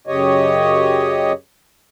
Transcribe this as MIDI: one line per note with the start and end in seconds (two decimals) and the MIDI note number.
0.07 1.32 42
0.07 1.32 49
0.07 1.32 67
0.07 1.32 73
0.07 1.32 75